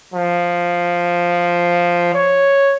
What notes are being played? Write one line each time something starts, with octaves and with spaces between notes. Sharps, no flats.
F3
C#5